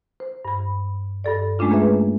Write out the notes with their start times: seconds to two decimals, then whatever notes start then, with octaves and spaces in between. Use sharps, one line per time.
0.20 C5
0.45 G2 B5
1.24 G2 A4 D5
1.59 G#3 A3 C#4 D4 F4
1.71 A#3 G#4 B4 E5